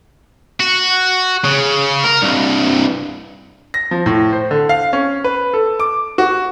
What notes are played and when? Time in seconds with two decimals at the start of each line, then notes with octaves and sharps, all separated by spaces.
0.60 F#4
1.44 C#3
2.04 A#4
2.22 C2 G2
3.74 A#6
3.91 F3
4.06 A2
4.33 C5
4.51 D3
4.69 F5
4.93 C#4
5.24 B4
5.54 A4
5.80 D6
6.18 F#4